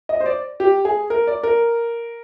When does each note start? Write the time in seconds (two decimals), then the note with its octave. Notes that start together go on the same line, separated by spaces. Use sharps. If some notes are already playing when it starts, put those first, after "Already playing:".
0.09 D#5
0.20 C5
0.26 D5
0.60 G4
0.85 G#4
1.10 A#4
1.27 D5
1.43 A#4